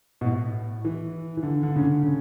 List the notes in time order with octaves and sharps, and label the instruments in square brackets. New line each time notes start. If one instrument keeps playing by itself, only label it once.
[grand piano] B2
A2
E3
E3
D3
D3
C#3
D3
C#3